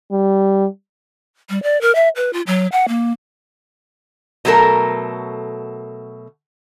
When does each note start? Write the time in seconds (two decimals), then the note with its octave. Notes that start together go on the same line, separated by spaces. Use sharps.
0.11 G3
1.50 G3
1.63 D5
1.81 A#4
1.95 E5
2.16 B4
2.33 F4
2.47 F#3
2.72 F#5
2.88 A#3
4.45 B2 F#3 A3 A4 A#4